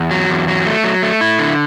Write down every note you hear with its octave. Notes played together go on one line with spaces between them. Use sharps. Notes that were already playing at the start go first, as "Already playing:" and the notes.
Already playing: E2
F#3
E2
F#3
A3
F#3
A3
E4
D3